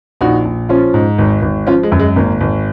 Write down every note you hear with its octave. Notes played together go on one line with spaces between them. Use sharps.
A#1 D#4 F#4
A#1
F3 C#4 F4
G#2
G#1
G#1
F3 C#4 F4
G#3
F#2
G#3
G#1 A#3
G#1